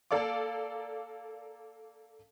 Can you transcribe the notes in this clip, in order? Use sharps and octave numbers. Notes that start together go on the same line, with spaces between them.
A#3 A4 D5 F5 D6